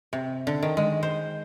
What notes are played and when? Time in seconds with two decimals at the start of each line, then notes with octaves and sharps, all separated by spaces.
0.13 C3
0.47 D3
0.62 D#3
0.77 G#3
1.03 C5